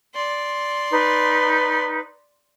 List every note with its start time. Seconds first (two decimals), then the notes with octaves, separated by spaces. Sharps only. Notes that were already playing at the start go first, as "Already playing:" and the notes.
0.15 D5 C6
0.91 D#4 B4